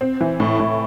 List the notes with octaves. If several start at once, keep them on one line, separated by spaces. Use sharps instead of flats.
C4
E3
A2
A2